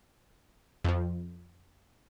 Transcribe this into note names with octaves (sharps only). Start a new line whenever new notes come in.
F2 F3